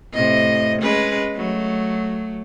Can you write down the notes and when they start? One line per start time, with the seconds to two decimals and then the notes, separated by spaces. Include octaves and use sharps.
0.14 A2 C3 D#5
0.81 G#3 C#4 B4
1.35 F#3 A3